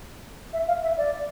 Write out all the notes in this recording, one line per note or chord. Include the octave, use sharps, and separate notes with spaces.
E5
F5
E5
D5